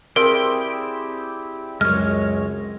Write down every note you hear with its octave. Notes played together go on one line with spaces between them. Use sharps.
C4 E4 G4 G#4 A#4 D5 D7
C#2 F#2 G#3 C#5 F6